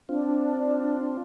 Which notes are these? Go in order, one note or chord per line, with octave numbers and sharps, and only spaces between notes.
C4 D4 F4